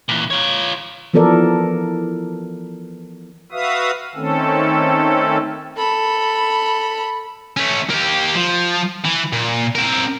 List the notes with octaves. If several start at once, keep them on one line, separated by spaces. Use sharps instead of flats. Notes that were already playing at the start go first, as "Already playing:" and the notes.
A#2 E3
F4 C#5
E3 F3 B3 A4 A#4 D5
F#4 B4 E5 F5 D#6
D#3 A3 C4 C#4 A4
A4 B5
A3 C#4
A#3 G4
F3
E3
A#2
C4 A#4